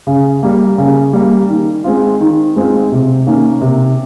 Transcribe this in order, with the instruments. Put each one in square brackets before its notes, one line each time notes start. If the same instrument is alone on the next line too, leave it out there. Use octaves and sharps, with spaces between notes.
[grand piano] C#3
G3 A#3
C#3
G3 A#3
D#3
G#3 C4 F4
D#3
G#3 C4 F4
C3
D#3 A#3 C#4
C3